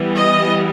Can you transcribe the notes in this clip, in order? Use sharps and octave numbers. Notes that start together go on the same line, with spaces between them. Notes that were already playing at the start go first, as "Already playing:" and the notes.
Already playing: E3 G3 B3
D#5